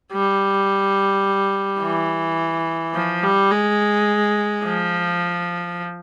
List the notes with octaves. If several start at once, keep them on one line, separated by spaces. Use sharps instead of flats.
G3
E3
F3
G3
G#3
F3